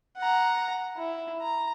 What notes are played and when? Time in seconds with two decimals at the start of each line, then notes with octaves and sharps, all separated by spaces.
0.17 F#5 A#5
0.97 E4
1.41 A#5